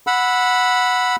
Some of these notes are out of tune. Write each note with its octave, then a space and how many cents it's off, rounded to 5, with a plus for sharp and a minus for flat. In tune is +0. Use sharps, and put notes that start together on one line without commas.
F#5 -10 B5 +0 E6 +0